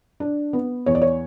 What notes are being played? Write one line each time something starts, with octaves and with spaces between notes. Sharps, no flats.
D4
B3
E2 C#5
D5
C#5